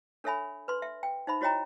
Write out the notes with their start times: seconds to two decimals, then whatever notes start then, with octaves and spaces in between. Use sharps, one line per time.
0.24 D4 A4 C#5 E5 G#5 B5
0.68 B4 C6
0.82 E5
1.03 G5
1.27 D#4 C5 E5 B5
1.41 E4 F#4 C#5 D#5 G5 A#5